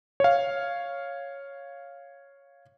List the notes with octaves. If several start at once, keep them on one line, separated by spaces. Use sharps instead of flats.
C#5 F5